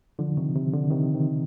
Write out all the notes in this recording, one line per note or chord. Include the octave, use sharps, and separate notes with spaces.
D3 F3
C3 D#3
C3
D3
C3 D#3
C3 D#3